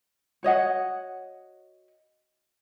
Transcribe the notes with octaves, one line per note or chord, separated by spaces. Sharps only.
F#4 C#5 D#5 F#5